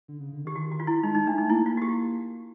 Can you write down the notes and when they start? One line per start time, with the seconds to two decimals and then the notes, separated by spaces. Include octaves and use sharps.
0.08 D3
0.20 C#3
0.33 D3
0.45 D#3 G4
0.56 F#4
0.72 F#4
0.80 F4
0.87 E4
1.03 G#3 D#4
1.15 D#4
1.27 A3 D4
1.38 D#4
1.50 A#3 E4
1.66 F4
1.77 F#4
1.82 G4